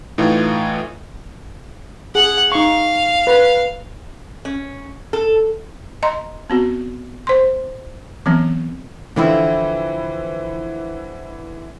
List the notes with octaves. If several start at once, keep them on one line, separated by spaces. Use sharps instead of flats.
A2 E3 D#4 F4
G#4 F#5
D#4 F5 C#6
B4
C#4
A4
D#5 A#5 C6
B3 C4 F#4
C5 C6
E3 F#3 B3 C4
D3 E3 F3 C4 E4